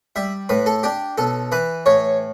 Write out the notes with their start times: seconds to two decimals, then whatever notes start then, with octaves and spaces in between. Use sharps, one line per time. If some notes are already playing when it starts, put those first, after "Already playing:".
0.16 G3 E5
0.49 A2 B4
0.66 A4
0.83 D4 G4
1.18 B1 A4
1.52 E3 B4
1.86 A2 C#5